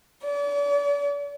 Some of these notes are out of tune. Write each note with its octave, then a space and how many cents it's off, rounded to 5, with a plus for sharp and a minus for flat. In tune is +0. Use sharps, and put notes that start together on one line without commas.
D5 -40